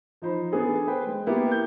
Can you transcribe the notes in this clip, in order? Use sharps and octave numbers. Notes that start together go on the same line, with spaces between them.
F3 D#4 C5 B5
B3 D4 G#4 A4
B4 C5 G5
G#3
A#3 B3 E4 G4
G6